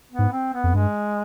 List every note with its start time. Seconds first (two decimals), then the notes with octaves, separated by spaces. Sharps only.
0.12 B3
0.19 G#2
0.32 C4
0.54 B3
0.64 F2
0.74 G2 G#3